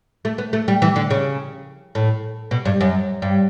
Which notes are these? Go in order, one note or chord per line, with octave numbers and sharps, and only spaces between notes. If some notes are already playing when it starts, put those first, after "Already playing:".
A3
B3
A3
G3
E3
D3
C#3
A2
B2
G2
F#2
G2